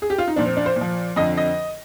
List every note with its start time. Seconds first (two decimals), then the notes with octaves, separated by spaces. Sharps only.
0.02 G#4
0.10 G4
0.18 F4
0.28 D#4
0.36 A#2 F3 D4
0.46 C4
0.57 D4
0.66 C5
0.76 A#2
0.81 F3
1.16 F2 D3 F3 D#5
1.37 D#5